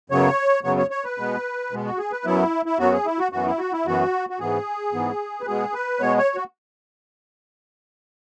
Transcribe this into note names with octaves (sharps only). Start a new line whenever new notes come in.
F#2 C#3 F#3 B3 C#5
F#2 C#3 F#3 B3 C#5
C#5
C#5
B4
B2 G#3 B3
B2 G#3 B3
F#4
G#4
B4
F#2 F#3 B3 E4
E4
F#2 F#3 B3 F#4
G#4
E4
F#4
F#2 E3 B3 F#4
E4
F#4
E4
F#2 E3 B3 F#4
F#4
G#2 E3 B3 G#4
G#2 E3 B3
B4
B2 G#3 B3 G#4
B4
B2 G#3 B3 C#5
C#5
F#4